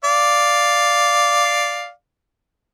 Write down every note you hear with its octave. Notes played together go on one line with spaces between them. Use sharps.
D5 F5